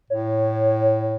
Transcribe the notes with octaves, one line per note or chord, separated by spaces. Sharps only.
A2 C#5